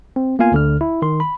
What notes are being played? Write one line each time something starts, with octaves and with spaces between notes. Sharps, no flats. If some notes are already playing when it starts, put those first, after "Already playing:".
C4
A#3 B3 F4 F5 G#5
D2 D3 F6
E4
D#3 C6
B5